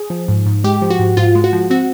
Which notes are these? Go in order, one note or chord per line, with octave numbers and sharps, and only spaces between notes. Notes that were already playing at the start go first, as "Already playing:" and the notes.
Already playing: G#4
F3
G#2
G#2
G#3 G4
F3
F#4
G#2
G#2 F4
G#3
F#4
F3
C4 F#4